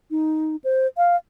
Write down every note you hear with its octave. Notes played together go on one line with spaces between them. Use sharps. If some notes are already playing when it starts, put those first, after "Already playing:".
D#4
C5
F5